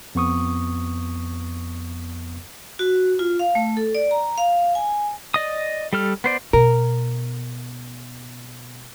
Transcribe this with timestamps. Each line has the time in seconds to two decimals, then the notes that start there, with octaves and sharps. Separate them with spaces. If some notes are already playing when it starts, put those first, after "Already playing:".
0.15 F2 B3 C#6 D#6
2.79 F#4
3.19 F4
3.39 F5
3.55 A3
3.77 A4
3.95 D5
4.11 A#5
4.38 F5
4.75 G#5
5.34 D5 D#5 D#6
5.93 G3 A4 F6
6.24 B3 C5 D5
6.53 B2 A#4